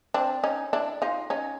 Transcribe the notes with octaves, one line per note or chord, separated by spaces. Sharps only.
C4 D4
C#4 D#4
D4 E4
D#4 F4
C#4 D#4